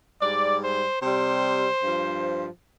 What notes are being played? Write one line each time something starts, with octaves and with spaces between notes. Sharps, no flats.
G#2 G3 D5
C5
C3 G3 C5
G2 F3